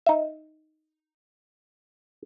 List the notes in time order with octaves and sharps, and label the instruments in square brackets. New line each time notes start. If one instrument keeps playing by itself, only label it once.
[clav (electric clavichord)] D#4 E5